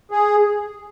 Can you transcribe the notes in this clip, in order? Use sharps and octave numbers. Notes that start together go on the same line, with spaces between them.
G#4